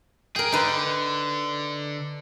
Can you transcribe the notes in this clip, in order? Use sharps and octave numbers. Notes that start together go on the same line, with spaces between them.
G#4 A#4 G5
D3 D#4 B4